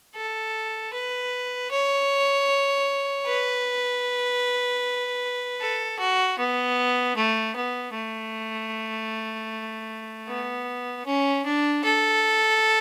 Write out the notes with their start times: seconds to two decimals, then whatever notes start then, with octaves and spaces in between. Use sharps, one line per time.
0.15 A4
0.94 B4
1.71 C#5
3.27 B4
5.61 A4
5.99 F#4
6.39 B3
7.16 A3
7.56 B3
7.94 A3
10.28 B3
11.06 C#4
11.46 D4
11.84 A4